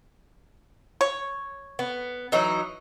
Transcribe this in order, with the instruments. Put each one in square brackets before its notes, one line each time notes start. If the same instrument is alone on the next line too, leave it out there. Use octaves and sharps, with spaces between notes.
[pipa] C#5
[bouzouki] B3
E3 F#3 D#4